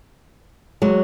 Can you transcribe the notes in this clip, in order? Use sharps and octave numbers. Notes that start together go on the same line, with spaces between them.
F#3 G#3